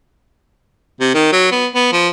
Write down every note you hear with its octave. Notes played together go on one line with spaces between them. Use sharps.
C3
D#3
F#3
B3
B3
F3